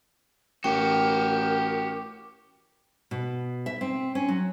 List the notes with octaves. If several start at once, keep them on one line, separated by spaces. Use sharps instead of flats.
A1 F#4 G4 A#4 G5
B2
E5
C4
C#4
F#3